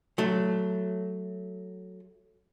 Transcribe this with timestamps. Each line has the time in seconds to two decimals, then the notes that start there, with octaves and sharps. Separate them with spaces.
0.18 F#3 A3